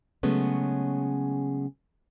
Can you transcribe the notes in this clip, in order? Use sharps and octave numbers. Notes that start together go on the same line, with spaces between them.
C#3 F#3 G#3 A3 B3 C#4